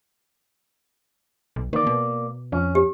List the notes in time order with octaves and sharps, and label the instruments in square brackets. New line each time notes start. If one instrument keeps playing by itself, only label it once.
[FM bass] B1
[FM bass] D#3 [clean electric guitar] A#3 D5
[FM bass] B2
[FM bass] F2 [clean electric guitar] C#4
[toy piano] G4